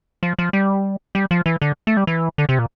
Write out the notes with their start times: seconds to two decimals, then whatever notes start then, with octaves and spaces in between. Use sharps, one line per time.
0.23 F3
0.39 F3
0.53 G3
1.15 G3
1.31 F3
1.46 E3
1.62 D3
1.87 A3
1.97 G3
2.07 E3
2.38 D3
2.49 C3
2.59 A#2